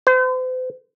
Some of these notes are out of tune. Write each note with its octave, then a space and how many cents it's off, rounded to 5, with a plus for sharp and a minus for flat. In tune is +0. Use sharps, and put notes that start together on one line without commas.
C5 -40